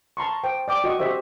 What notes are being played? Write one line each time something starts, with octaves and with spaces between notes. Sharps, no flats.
A5 A#5 C6 C#6
C5 G5
D5 G5 D6
F#4 D#5 C#6
F#4 G4 C5 D#5 E5